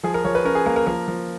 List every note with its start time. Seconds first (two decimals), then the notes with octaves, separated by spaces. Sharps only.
0.03 F3 G#4
0.14 A#4
0.24 F3 C#5
0.35 B4
0.45 C#4 A#4
0.55 G#4
0.66 A#3 A#4
0.76 A#4
0.87 F3 A#4
1.08 F3